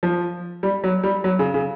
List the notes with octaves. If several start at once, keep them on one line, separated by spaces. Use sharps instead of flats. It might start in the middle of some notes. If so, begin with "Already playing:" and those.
F3
G3
F#3
G3
F#3
C#3
C#3